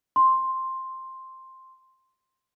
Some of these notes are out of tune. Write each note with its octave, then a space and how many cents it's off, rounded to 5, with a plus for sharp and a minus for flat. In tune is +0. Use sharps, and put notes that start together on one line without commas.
C6 +5